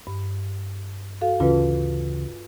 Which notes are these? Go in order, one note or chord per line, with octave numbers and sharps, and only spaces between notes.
G2
F#4 A4 F5
D2 C#3 E3 F4 B4